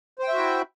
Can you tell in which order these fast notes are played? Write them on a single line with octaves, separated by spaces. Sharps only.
C5 G5 E5 F#4 E4